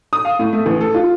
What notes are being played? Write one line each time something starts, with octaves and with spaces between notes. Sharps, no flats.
D#6
F5
A2
A3
A1
A4
F4